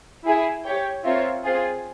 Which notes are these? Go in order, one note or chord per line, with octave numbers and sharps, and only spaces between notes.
E4 G#4 E5 G#5
G4 C#5 G5
C4 F4 A#4 C#5 E5
C4 F4 G#4